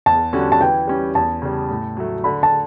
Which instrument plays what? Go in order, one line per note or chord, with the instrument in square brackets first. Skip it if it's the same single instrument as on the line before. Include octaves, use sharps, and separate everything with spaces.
[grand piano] E2 [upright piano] A5
[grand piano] D3 G3 C#4 F#4
[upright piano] A5
[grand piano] E3 [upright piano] G5
[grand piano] G3 C#4
[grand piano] E2 [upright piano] A5
[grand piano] C#3 G3
A2
F#3 A3
[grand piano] D3 [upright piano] B5
[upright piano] A5